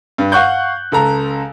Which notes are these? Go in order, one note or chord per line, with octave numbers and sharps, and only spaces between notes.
G2
F5 F#5 C#6 F#6 G6
C#2 A4 A#5